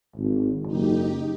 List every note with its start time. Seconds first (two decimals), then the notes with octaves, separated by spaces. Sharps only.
0.16 G#1
0.67 F#1 D#4 G4